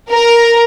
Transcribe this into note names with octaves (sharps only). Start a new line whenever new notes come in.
A#4